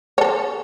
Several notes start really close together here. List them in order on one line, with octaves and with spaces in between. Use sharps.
C#5 A4 C5